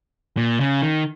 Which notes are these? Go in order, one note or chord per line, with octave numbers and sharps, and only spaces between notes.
A#2
C#3
D#3